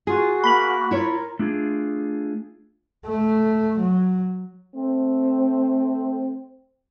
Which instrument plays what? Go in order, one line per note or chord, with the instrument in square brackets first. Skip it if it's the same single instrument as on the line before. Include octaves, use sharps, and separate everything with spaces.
[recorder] F4 [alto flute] F#4 [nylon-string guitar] G#4
[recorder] A#3 [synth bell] B5 B6 F#7
[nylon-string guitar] E4 C#5 [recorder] F4 [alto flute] A#4
[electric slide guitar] A3 D4 F4 G#4
[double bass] A3
F#3
[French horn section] A3 C4